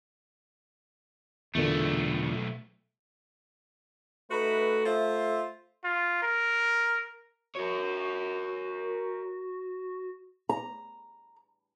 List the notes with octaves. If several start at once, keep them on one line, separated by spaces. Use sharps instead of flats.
B1 E2 A#2 D3 A3
A3 D#4 F#4 B4
F4 C5 E5
F4
A#4
F#4 A#4 C#5
A#5